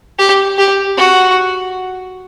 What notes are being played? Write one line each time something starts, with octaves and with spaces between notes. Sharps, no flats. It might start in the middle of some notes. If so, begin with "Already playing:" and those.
G4
G4
F#4